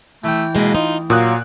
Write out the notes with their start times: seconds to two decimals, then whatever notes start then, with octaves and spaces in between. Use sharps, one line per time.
0.24 E3 A3 G5
0.54 B2 G#3 A#3
0.75 D#4 F4
1.10 A#2 F#3 A#3 D#6 F#6